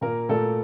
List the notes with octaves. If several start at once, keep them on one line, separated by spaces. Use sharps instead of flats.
A#2 A#3 A#4
A#2 A3 A4